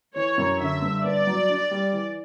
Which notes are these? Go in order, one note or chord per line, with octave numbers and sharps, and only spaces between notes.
E3 C#5
F#2
D3 E5
G2
B3 D5
F#3
D4
G3
E3